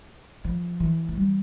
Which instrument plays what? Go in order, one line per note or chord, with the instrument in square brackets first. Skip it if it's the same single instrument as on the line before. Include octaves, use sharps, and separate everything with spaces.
[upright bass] F3
E3
A3
G3